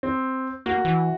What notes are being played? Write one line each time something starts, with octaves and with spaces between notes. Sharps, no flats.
C4
A#3 F#4
E3